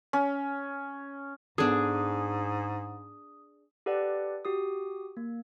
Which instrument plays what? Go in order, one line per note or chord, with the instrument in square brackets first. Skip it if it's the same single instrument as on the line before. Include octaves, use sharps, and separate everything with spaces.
[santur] C#4
[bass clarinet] G#2 [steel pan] B3 A4 [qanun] D4 G#4 [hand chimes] D#6
[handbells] G4 A4 B4 D5 F#5
F#4 G4 D#6
A#3